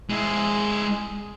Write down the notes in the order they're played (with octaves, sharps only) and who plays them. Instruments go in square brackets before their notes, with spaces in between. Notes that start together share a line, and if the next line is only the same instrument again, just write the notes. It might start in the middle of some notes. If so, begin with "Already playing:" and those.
[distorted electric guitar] G#3 E4